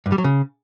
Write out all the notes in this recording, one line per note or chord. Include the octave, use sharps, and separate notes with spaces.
G2
G3
F#3
C#3